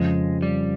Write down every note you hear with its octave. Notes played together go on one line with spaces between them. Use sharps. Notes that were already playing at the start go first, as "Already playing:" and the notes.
Already playing: F2 C#3 F3 G#3 C4
G3